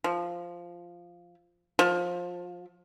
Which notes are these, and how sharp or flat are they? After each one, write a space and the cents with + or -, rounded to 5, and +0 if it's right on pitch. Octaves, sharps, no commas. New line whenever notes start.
F3 -5
F3 +20